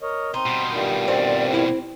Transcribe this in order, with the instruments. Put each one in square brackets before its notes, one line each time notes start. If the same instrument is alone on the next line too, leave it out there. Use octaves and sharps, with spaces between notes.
[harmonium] A#4 C#5 D#5
[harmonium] C4 [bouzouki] D#4 [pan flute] C6
[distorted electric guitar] B2 G3
[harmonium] G2 A#2 D#3
[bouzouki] C4 [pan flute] D5
[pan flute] E4